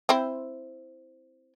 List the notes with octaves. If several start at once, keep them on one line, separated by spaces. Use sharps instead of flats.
C4 E4 C5